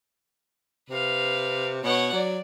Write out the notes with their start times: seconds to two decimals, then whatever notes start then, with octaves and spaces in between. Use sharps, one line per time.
0.90 C3 B4 F5
1.84 B2 C#5 F#5
2.13 F#3 D5